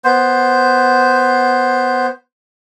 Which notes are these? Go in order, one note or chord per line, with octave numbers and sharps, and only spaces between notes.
B3 C5